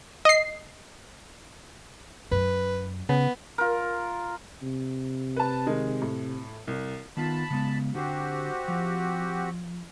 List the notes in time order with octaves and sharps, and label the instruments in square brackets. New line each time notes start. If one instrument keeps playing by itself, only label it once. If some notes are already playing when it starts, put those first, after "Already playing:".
[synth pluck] D#5 C7
[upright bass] F#2 [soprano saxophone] B4
[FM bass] C#3 [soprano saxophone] B3
[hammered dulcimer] F4 A#4
[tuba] C3
[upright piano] B4 A5
D#3 G#3
A2
C2
[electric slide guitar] D#3 B3 F4 [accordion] A5 B5
[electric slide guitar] C#3 G#3 B3
[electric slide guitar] D3 C5 [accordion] C4 F#4 G4
[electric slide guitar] F3